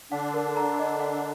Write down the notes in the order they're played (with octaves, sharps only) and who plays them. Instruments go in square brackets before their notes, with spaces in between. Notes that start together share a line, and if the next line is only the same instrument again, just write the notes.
[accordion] D3 D4 [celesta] F#5
[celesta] A#4
A#5
D#5
F#5